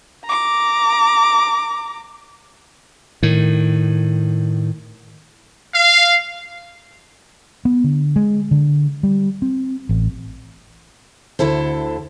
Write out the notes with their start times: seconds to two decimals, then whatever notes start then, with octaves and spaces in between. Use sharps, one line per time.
0.25 A#5 D6
3.23 A2 D#3
5.74 F5
7.65 B3
7.84 D3
8.16 G#3
8.51 D3
9.03 G3
9.42 C4
9.89 A1
11.39 D2 D3 E4 A4 C5